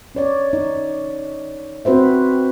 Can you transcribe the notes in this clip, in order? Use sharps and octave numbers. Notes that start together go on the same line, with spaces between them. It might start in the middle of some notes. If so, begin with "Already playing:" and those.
C#4 C#5 D5
D#4
C4 F#4 B4 C5 E5